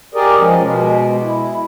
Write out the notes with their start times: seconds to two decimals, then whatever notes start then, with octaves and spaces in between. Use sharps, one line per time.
0.15 G4 G#4 A#4 D5 D#5
0.39 F3 G#3 C#4
0.61 B2 G#3
1.22 E4